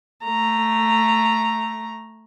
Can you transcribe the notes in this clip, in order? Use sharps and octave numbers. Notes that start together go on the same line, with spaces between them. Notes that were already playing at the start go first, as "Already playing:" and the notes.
A3 A#5